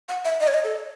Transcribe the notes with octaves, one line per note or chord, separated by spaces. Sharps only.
F#5
E5
D#5
C#5
D#5
A4